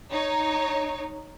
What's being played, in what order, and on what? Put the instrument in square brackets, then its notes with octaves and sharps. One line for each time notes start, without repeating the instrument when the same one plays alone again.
[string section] D#4 C#5